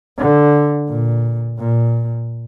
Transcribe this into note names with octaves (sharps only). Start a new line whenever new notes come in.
D3
A#2
A#2